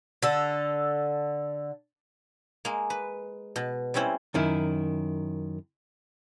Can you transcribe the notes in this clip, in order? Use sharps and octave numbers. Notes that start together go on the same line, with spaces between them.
D3 A4
G#3 A#3
B4
B2
G3 C4 C#4 E4 C5
F#2 D#3 E4